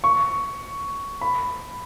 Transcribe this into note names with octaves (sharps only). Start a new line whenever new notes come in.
C#6
B5